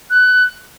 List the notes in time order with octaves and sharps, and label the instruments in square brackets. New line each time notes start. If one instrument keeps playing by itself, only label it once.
[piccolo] F#6